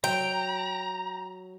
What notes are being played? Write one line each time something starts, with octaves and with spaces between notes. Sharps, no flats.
F#3 G5 A#5